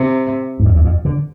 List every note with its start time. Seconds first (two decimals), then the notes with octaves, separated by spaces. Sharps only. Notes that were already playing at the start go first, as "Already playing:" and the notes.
Already playing: C3
0.60 G#2
0.65 F2
0.75 E2
0.85 F2
1.05 D3